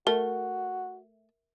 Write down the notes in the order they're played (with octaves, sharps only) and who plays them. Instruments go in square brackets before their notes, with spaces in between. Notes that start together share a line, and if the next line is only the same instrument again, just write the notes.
[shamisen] A3 [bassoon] F#4 [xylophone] A#4